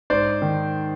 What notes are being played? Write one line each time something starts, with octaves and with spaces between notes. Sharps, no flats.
G#2 C5 D5
D#3